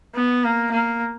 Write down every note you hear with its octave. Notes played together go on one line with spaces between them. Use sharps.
B3
A#3
A#3